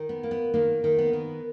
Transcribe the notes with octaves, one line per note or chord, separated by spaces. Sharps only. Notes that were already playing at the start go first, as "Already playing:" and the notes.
Already playing: D#3
B3
A#3
B3
D#3 A#3
D#3
B3
D#3